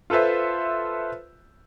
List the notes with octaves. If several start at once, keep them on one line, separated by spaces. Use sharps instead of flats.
F4 A4 B4 C5 E5